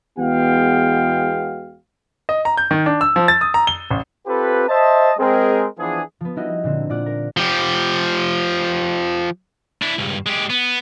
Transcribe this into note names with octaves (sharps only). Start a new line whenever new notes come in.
E2 G#3 B3 F#4 F5 G5
D#5
A#5
G6
D#3
D4
E6
F3
A6
D#6
A#5
G7
A1
C4 F4 G4 A4 B4
C5 D#5 E5 A5
G#3 C4 G#4 A#4
E3 F3 B3 D4 G#4
F3 B3
G3 D#4 E4 F#4 A#4 D#5
A#2 D3 C4
A#2 F4 D5 F#5
A#4
F3 G4
D4 E4
C#2 G2
G#3 G4
B3